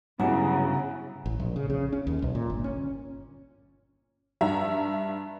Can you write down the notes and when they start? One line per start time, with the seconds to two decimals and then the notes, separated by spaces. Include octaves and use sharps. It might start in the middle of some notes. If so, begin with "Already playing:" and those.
0.20 G2 C#3 F#3 B3 E4 G#5 A#5
1.26 A1
1.40 A#1
1.56 C#3
1.70 C#3
1.92 C#4
2.07 D#2
2.22 B1
2.35 A#2
2.50 G1
2.64 C#4
4.41 G2 E5 A#5